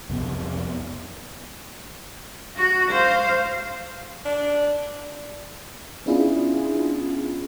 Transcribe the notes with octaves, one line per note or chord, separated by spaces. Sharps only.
C2 F2 C3 B3
F#4
C5 F5
D4
B3 C#4 D4 E4 F4 G#4